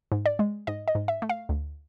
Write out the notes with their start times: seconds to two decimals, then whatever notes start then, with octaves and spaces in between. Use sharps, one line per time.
0.12 G#2
0.26 D5
0.39 G#3
0.67 G#2 D#5
0.88 D#5
0.95 G#2
1.08 E5
1.22 A3
1.29 F5
1.49 D2